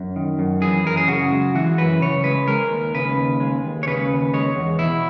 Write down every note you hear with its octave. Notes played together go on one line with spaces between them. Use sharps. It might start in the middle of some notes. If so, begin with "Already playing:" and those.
Already playing: F#2
D#3
F#2
E3 G#4
F#2 A#4
G#4
C#3 F#4
G#3
E3 F#4
F#2 B4
C#3 C#5
G#3 B4
G#3 A#4
D#2
C#3 B4
D#2
G#3
D#2
C#5
C#3 B4
D#2
G#3 C#5
E2
B2 E4